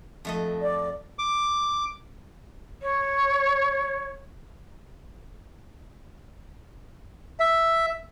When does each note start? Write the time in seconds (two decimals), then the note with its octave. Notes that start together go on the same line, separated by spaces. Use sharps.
0.25 F2 A3 D#5
0.62 D5
1.19 D6
2.82 C#5
7.40 E5